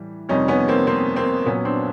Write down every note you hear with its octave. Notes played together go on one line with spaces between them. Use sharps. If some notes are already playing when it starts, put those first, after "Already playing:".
Already playing: A2 E3 G3
F2 C3 D#3 G3 C#4 D#4
B3 C#4
A#3 C4
A#3 C4
A#3 C4
A#2 F#3 B3 C#4
C4 D4